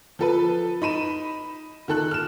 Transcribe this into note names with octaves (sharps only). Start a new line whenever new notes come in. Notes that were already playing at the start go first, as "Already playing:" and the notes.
F3 A4 B4
D#4 B5 D#7 E7
D#3 A4 F#6
F6 E7